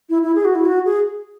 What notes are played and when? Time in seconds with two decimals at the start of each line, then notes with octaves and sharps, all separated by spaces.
0.10 E4
0.23 E4
0.35 G#4
0.45 F#4
0.55 E4
0.66 F#4
0.85 G#4